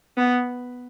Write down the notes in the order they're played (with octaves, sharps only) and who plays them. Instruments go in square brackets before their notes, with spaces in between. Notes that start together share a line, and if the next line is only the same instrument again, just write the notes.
[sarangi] B3